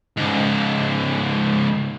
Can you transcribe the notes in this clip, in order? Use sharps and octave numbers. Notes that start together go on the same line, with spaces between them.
C#2 G#2